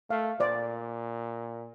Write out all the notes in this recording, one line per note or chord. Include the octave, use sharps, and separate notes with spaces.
A3 F5
A#2 C5 D5